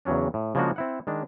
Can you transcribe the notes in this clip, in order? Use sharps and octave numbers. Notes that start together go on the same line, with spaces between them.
E2 C#3 F#3 C#4 D4
A2
C#3 F3 G#3 A#3 D4 F#4
C4 E4 F#5
D#3 G#3 D4